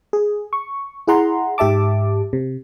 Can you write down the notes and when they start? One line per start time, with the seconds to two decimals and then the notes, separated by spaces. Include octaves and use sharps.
0.13 G#4
0.53 C#6
1.08 E4 G#4 F#5 A#5 C6
1.58 G#2 G4 E5 A5 D6
2.33 C3